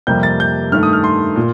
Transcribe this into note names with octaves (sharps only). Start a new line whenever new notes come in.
F2 C3 G3 A#3 G6
A6
G6
G2 D#3 A3 F6
D#6
F6
C6
A#2